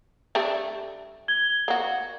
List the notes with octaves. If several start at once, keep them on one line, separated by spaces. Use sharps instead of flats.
G3 A3 D4
G#6 G7
A#3 F#4